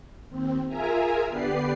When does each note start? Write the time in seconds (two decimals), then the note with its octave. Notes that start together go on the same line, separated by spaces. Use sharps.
0.29 D#2 C4
0.67 F4 G#4 A#4 E5 G#5 A#5
1.27 D3 B3 G4 B4 D5 C7